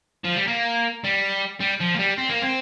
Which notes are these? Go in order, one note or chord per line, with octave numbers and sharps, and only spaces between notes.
F3
G3
A#3
G3
G3
F3
A#3
G3
C4
A#3
C4